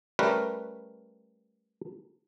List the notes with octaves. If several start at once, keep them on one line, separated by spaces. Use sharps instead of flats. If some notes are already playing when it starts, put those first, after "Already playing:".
G3 A3 C#4 A#4 B4